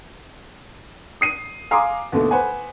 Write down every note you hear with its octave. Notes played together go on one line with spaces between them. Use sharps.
D#6 C7 D#7
F5 G#5 A#5 C6 D6 D#6
D#2 B2 D3 A3
B4 C5 F#5 G#5